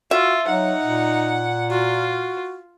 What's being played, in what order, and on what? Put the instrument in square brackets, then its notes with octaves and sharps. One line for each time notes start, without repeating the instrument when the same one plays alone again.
[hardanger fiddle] F4 [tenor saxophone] F#4 [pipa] E5
[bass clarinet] F#3 [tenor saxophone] D#4 [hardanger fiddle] F#5
[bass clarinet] A#2
[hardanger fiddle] F4 [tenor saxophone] F#4